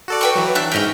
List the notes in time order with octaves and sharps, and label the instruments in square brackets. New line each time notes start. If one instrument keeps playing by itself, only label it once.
[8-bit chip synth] F#4 A4 D5
[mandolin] B4 G5 C#6
[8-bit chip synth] E3 F#3
[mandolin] D4 E5 F#6
[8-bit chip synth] G#2 G5 [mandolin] C#4 D#4 C#5